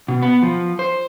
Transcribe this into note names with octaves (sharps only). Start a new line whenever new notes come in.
B2
B3
F3
C5